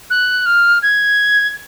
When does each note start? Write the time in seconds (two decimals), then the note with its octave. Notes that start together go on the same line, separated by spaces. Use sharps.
0.10 F#6
0.46 F6
0.83 G#6